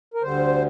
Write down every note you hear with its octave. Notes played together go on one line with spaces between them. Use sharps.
A#4
D2 D3 G3 C5